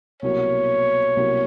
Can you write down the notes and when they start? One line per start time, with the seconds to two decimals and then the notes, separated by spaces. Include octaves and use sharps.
0.22 C2 B2 F#3 A#3 C#5
1.17 C2 B2 F#3 A#3